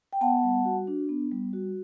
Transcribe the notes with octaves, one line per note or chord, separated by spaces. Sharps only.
G5
B3 F#5 A5
G3
F#4
D4
B3
G3
F#4